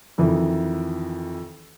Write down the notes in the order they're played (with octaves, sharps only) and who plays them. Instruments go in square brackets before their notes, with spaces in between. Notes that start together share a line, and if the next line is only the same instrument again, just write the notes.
[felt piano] F2 D#3 E3